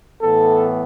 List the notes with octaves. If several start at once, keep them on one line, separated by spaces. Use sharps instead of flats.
A2 E3 B3 A4